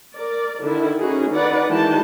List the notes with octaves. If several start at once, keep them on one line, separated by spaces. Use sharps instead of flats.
A#4 D5
D3 D#3 E4
C#4 D#4 F#4 G#4
D#3 D#4 B4 D5 F#5
D#3 E3 G#3 F#4 G5 A5